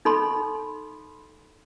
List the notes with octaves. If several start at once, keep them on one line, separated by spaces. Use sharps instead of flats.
D#4 A4 B5 C6